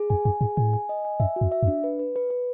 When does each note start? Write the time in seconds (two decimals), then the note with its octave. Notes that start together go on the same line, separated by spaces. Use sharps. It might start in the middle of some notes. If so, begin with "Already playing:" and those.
Already playing: G#4
0.10 F2 G#5
0.25 F#2 G#5
0.41 G#2 G#4
0.57 A2 G#5
0.73 G#5
0.89 D#5
1.05 G#5
1.20 F#2 E5
1.36 F#4
1.41 F2
1.52 E5
1.63 F2
1.67 D4
1.84 B4
1.99 B4
2.16 B4
2.30 B4